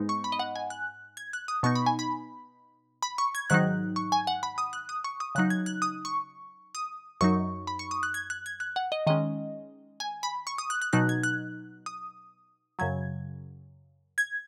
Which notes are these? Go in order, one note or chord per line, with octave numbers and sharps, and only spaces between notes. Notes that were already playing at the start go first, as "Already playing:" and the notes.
Already playing: G#2 G#3 B3 D#4
C#6
B5
D#5
F#5
G#5
F#6
G#6
F#6
D#6
B2 B3 D#4 C#6
B5
G#5
B5
B5
C#6
G#6
G#2 D#3 F#3 D#4 F#6
C#6
G#5
F#5
B5
D#6
F#6
D#6
C#6
D#6
C#3 F#3 D#4 F#6
G#6
F#6
D#6
C#6
D#6
F#2 F#3 D#4 C#6
B5
C#6
D#6
F#6
G#6
F#6
G#6
F#6
F#5
D#5
D#3 G#3 C#4 D#5
G#5
B5
C#6
D#6
F#6
F#6
B2 F#3 D#4 F#6
G#6
F#6
D#6
F#2 C#3 F#3 G#6
G#6